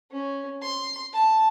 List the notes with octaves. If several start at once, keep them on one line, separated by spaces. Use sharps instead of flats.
C#4
C6
A5